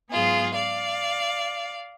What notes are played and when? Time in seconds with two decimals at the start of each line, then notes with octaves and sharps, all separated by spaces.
0.11 G#2 F#3 B3 F4 G#4
0.55 D5 F5